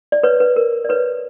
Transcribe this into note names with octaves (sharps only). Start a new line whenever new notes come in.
D5
B4 C#5
B4
A#4
D5
B4 C#5